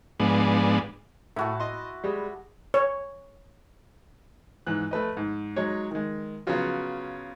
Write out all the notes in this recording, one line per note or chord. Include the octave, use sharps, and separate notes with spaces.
G#2 F3 G#3 B3 D4
A2 E4 F#4 A5
D#5 C6
G3 G#3
C#5
G#2 E3 F#6
A3 B4 D#5
G#2
F#3 G#3 D#4 C#5
D#3 G#3
C#3 F#3 B3 C#4 F4 F#4